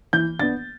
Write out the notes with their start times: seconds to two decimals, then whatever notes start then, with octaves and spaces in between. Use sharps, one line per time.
0.13 E3 G6
0.39 B3 D4 A6